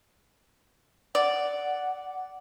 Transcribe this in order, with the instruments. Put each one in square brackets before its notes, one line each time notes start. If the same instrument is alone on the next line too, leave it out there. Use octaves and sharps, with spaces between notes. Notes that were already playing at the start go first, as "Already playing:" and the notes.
[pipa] D5 [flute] F#5